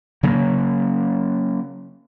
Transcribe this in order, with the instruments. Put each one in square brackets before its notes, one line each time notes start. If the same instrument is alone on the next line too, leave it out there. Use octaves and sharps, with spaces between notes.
[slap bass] C#3 F#3 A#3